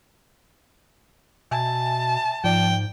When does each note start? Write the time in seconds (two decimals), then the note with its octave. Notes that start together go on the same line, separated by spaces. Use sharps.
1.51 B2 E5 G#5 A5
2.44 G#2 F3 D5 G5